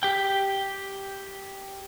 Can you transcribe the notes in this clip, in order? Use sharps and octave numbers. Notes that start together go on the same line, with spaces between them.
G4 G5